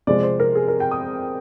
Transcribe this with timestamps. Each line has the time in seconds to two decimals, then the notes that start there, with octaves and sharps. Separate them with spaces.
0.07 C3 F3 G#3 C4 D5
0.23 C5
0.40 A#4
0.55 G#4
0.68 A#4
0.80 G5
0.91 D#6